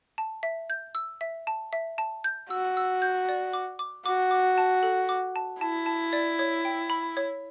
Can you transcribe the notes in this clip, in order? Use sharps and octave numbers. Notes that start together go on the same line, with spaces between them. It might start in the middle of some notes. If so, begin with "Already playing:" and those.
A5
E5
G6
E6
E5
A5
E5
A5
G6
F#4 E6
E6
G6
D5
D6
D6
F#4 D6
D6
A5
A4
D6
A5
E4 A5
A5
D5
C#5
G5
B5
C#5